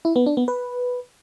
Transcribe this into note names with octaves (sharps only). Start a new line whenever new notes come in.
E4
B3
D4
B3
B4